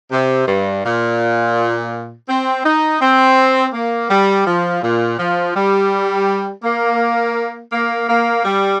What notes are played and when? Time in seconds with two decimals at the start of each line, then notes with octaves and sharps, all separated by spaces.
0.12 C3
0.47 G2
0.84 A#2
2.28 C4
2.64 D#4
3.01 C4
3.74 A#3
4.10 G3
4.47 F3
4.82 A#2
5.19 F3
5.55 G3
6.64 A#3
7.72 A#3
8.09 A#3
8.45 G3